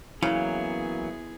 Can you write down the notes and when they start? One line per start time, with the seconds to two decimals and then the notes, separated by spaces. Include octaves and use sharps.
0.23 C#3 E3 F#3 A#3 B3 E4 G#4